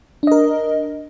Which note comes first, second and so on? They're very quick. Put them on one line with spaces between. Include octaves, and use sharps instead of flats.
D4 D#5 A#4